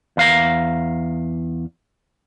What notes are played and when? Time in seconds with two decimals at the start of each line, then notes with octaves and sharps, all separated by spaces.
0.17 E2 F5 A#5